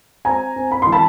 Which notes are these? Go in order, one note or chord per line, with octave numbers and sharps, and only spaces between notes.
C4 G#5 A#5
C4
B5
E3 C6
A5 B5